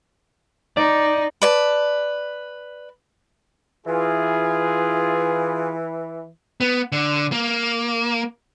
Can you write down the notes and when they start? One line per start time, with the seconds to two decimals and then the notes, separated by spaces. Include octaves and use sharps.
0.77 D#4 D5
1.42 B4 D5 A5
3.87 E3 F4 G#4
6.61 B3
6.92 D3
7.32 A#3